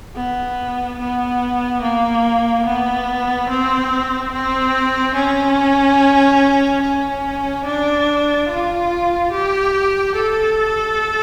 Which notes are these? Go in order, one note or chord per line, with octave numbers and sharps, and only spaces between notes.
B3
B3
A#3
B3
C4
C4
C#4
C#4
D4
F4
G4
A4